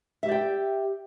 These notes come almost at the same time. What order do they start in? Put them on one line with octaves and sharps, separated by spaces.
E5 G4 D5 G5